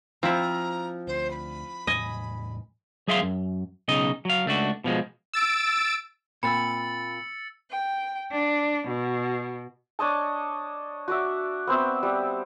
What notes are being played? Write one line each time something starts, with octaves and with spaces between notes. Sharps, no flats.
F3 C4 E4 A#5
D2 C5
B5
E2 A2 F#3 D#5 G#5
F#3 G#4 E5 F5 C6
F#2
B1 C#3 D#4 D#5
F#3 F5
C#2 A3 D4 F#4
B2 F3 G#3
E6 A6 D7
A#2 C4 B5 E6 A6 C#7
G5
D4
B2
D4 C#5 D#5 A5
F#4 D5 E5
B3 C4 C5 E5
G3